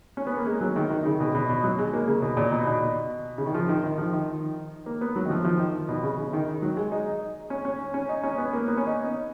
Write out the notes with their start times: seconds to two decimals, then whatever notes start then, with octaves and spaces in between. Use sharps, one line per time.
0.17 C#4
0.27 B3
0.36 A#3
0.46 G#3
0.61 F#3
0.76 D#3
0.90 D#3
1.05 C#3
1.20 B2
1.35 B2
1.49 B2
1.64 F#3
1.78 G#3
1.93 A#3
2.08 C#3
2.22 B2
2.37 A#2
2.52 B2
2.66 B2
3.38 C#3
3.46 D#3
3.54 F3
3.69 D#3
3.83 D#3
3.98 F3
4.13 D#3
4.86 A#3
5.01 B3
5.16 F#3
5.26 D#3
5.30 F3
5.45 F3
5.60 D#3
5.89 B2
6.03 C#3
6.18 C#3
6.33 D#3
6.62 F#3
6.77 G#3
6.92 D#4
7.50 C#4
7.65 C#4
7.94 C#4
8.09 D#4
8.23 C#4
8.38 B3
8.53 A#3
8.68 B3
8.78 C#4
8.87 D#4